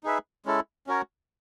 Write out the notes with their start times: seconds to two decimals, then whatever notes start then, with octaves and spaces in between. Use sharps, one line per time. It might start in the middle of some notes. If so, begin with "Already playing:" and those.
0.03 D#4 G#4 B4 E5
0.45 G#3 C#4 E4 A4
0.87 C#4 F#4 A#4 C#5